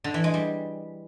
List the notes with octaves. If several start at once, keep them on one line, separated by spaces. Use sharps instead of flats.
D3
E3
G#3
G3